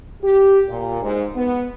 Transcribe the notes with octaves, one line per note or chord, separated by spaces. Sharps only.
G4
A#2
G#2
B3